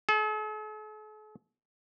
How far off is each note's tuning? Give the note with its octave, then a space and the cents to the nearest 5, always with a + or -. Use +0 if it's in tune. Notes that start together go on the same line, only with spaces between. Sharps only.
A4 -45